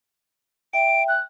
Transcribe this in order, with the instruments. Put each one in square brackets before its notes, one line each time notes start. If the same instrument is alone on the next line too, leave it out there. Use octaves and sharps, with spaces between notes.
[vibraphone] E5 G5 [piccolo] D7
[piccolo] F#6